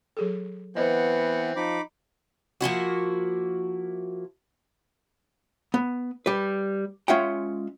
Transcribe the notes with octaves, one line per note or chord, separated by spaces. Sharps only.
F#3 G#4 A4
E3 B3 C4 C5 D#5 F#5
F3 D#4 B5 D6
F3 A#3 E4 F#4
B3
G3 B4
G#3 C#4 F4 E5 F#5 G5